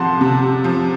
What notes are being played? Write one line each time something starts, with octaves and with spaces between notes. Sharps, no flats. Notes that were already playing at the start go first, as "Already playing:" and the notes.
Already playing: C3 F3 F#5 A5 C6
C3
F3